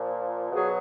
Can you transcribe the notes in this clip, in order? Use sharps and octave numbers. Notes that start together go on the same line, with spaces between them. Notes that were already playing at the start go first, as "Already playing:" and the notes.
Already playing: A#2 F3
B2 F#3 G#4